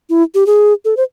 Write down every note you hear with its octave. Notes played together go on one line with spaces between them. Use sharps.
E4
G4
G#4
A4
C5